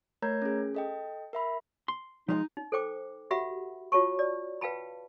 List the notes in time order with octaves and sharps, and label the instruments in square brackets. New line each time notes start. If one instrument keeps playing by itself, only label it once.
[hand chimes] A3 A#4 C#5 A#5 G6 G#6
C#4 G#4
A4 D#5 G5
A#4 E5 B5
[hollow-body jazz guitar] C6
[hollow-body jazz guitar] F3 F#3 G#3 [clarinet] D#4
[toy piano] D#4
A4 C5 G5 D6
F#4 G4 E5 F#5 B5
F4 F#4 C#5 A5 C#6
D5
B4 F5 G5 A5 B5